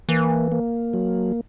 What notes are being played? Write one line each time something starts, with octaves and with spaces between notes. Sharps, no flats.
E3 A#3
A#3
F#3